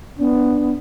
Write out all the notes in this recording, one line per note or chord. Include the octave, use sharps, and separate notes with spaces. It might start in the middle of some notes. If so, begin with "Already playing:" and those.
B3 D4